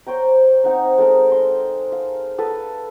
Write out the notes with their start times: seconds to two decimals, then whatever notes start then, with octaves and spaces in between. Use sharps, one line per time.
0.07 C5 C#5 G5 A#5
0.64 C4 D#4 F#5 A#5
0.98 G#3 A4 A#4 A#5
1.32 C6
1.92 F5
2.39 A4 B4 B5